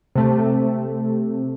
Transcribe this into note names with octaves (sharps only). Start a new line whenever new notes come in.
C3 A3